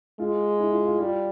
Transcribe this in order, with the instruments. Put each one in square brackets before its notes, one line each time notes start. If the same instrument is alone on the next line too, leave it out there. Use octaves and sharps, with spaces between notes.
[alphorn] G#3 [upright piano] F4
[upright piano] E4
F4
F4
[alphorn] G3 [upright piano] F4